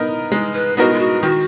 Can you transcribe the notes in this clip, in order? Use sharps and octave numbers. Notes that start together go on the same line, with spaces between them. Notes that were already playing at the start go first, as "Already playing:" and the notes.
Already playing: B3 D#4 A#4
G#3
B4
B3 D#4 F#4 A#4
F4
F#4
D#3 F#4